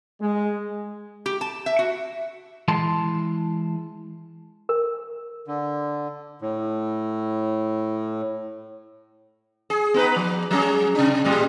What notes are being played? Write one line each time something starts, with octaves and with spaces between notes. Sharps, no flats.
G#3
G4
A5
E5
F#4
E3 G#3 A5 C6
A#4
D3
A2
G#4
B3 D#4 B4
F3
F#3 C#4 G#4
C3 D4
A2 G3 G#3